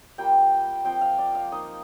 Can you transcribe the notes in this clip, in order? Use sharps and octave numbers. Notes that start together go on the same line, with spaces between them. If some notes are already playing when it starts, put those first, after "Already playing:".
G3 A#3 F4 G5
F3 C4 F4 G5
F5
D5
F5
F3 A#3 D#4 D#5